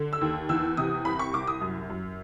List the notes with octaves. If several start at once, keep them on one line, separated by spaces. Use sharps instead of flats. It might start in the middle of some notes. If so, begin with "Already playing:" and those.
Already playing: D3
E6
D#2
E2 E6
C3 D#6
C2 B5
C#6
C2 D6
D#6
F#2
F#2